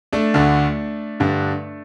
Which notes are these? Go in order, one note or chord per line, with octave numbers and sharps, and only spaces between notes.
A3 D4
D2 D3
G2 D3